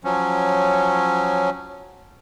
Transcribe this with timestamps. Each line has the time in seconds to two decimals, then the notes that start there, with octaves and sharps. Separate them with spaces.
0.04 F3 F#3 C#4